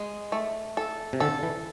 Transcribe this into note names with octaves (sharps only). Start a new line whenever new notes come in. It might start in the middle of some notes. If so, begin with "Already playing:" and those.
Already playing: G#3
A3
A4
C3
D3 A4
E3